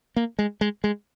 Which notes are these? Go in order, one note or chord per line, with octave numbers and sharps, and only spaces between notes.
A#3
G#3
G#3
G#3